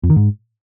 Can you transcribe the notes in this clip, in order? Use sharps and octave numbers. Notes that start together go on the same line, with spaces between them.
F2
D#3
G#2